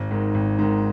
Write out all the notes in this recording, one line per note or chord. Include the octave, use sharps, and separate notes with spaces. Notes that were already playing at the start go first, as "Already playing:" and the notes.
Already playing: G#1
G#2 D#3
G#1
G#2 D#3